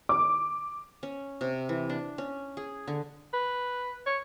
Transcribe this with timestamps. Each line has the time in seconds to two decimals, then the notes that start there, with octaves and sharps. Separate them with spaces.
0.09 D6
1.03 C#4
1.41 C3
1.69 E3
1.89 D4
2.18 C#4
2.57 G#4
2.88 D3
3.33 B4
4.06 C#5